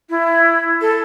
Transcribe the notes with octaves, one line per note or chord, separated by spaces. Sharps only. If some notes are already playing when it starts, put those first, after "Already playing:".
E4
A4